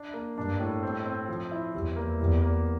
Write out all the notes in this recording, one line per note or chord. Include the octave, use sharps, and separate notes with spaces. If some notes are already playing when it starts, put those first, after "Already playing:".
Already playing: D4
A#3
G2 D4
A2
C4
C4
F3
E4
E2 G3
A#3
E2 G3
A#3